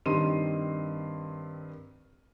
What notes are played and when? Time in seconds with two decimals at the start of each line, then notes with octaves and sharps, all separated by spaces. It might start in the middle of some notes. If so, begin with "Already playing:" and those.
0.06 G2 D#3 C4 D#5 C6 D#7